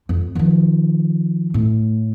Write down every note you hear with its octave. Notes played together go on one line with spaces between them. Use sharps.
F2
D#3 F3
A2